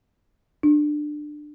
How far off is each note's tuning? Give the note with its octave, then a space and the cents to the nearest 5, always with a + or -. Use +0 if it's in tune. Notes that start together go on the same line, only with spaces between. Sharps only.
D4 +20